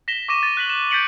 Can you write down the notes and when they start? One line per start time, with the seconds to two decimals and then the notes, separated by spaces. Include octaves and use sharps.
0.08 A#6 B6 E7 G7
0.28 C#6 D6 A#6 D#7 E7
0.43 A6 D#7
0.57 F#6 B6 F#7
0.70 E7
0.91 G6 A6 B6 C#7 D7 F#7